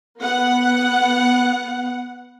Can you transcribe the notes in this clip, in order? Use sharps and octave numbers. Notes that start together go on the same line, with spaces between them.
B3 F#5